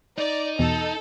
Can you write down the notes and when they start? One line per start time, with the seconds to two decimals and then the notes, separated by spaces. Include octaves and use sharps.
0.18 D#4 D5
0.59 E2 B2 A4